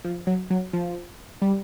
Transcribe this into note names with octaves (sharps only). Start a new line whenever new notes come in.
F3
F#3
F#3
F3
G3